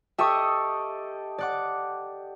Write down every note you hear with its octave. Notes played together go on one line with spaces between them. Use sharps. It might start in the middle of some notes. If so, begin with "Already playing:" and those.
G4 A4 D#5 E5 C#6 D#6
D5 F#5 D6